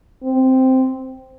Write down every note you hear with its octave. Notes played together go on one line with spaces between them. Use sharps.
C4